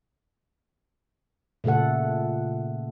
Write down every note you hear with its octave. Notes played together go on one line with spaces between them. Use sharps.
A#2 C#3 A3 A4 F#5